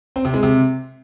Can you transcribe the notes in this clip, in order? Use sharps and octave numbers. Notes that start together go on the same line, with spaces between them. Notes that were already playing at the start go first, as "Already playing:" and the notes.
C4
C3
G#3
C3